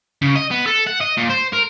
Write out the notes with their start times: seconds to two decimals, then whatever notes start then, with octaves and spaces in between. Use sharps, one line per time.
0.22 C#3
0.35 D#5
0.51 B3
0.66 A4
0.87 F#5
1.01 D#5
1.18 A#2
1.30 C5
1.53 A#4